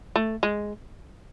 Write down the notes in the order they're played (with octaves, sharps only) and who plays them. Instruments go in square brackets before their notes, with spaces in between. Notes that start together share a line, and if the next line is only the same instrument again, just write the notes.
[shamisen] A3
G#3